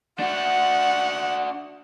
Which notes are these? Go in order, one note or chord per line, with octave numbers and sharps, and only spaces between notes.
D4 F#4 F#5